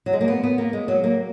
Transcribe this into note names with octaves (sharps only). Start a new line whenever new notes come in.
F#3
G#3
A#3
B3
B3
A#3
G#3
F#3
A#3